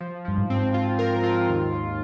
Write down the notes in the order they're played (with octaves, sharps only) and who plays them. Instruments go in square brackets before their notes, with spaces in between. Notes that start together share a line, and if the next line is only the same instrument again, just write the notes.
[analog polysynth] F3
[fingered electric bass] G2 [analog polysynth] F3
[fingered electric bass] G#2
[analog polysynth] C4
F4
A#4
F4
D#2
D#2